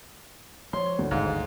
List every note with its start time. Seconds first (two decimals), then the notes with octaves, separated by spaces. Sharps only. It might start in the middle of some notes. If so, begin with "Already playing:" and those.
0.73 F3 F#3 C#5 C6
0.99 D2
1.11 G1 D#2 G#2 F5